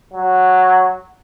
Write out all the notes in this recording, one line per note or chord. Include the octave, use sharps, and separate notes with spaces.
F#3